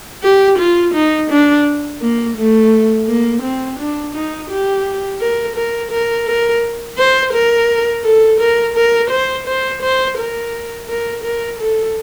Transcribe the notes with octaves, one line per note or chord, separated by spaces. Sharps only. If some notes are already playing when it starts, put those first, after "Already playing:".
G4
F4
D#4
D4
A#3
A3
A#3
C4
D4
D#4
G4
A#4
A#4
A#4
A#4
C5
A#4
A4
A#4
A#4
C5
C5
C5
A#4
A#4
A#4
A4